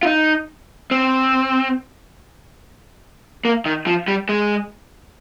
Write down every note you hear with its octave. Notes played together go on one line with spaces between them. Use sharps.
F4
D#4
C4
A#3
D#3
F3
G3
G#3